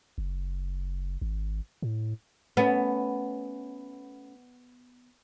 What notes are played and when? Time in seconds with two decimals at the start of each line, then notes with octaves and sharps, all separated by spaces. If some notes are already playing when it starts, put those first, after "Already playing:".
0.18 F#1
1.22 G#1
1.82 A2
2.57 A3 B3 C#4